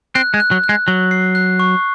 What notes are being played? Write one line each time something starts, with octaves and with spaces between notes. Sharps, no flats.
C4 F#6
G#3
F#6
F#3
F#6
G#3
F#3 F#6
C7
F#6
C#6